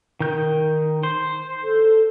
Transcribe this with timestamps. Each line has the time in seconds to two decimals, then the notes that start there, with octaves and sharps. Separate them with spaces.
0.20 D#3 G6
1.03 C5
1.63 A4